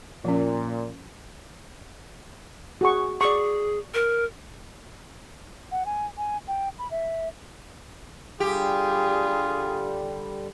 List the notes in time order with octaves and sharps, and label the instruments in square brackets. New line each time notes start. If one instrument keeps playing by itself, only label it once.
[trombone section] A#2 [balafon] F3 C#4
[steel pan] F#4 G#4 C#6
[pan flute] G#4 [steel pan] D5 C#6
[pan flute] A#4
[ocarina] F#5
G#5
G#5
G5
B5
E5
[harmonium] D3 G3 [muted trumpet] F4 [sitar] G4 [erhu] G#4